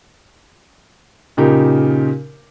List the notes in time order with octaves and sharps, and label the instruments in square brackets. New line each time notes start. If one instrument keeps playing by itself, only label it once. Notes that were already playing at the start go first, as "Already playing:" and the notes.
[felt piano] A#2 C#3 D#4 G4 A#4